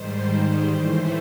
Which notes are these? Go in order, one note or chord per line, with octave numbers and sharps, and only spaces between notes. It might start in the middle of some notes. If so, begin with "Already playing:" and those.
Already playing: G#2 D#3 G3 C5
C5
A2 E3 A3 C5